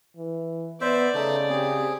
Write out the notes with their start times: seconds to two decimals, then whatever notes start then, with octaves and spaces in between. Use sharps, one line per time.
0.17 E3
0.81 B3 C5 D5 E5
1.15 C#3 A3 D#4
1.49 C4 G4 G#4